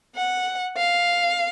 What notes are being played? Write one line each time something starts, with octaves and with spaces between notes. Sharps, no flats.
F#5
F5